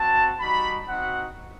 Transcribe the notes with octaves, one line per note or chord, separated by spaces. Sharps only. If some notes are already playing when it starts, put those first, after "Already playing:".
Already playing: C4 F#4 A5
G3 D#4 F#4 B5
C4 D#4 F#4 F#5